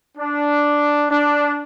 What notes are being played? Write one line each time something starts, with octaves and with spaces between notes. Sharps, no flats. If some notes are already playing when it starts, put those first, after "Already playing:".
D4
D4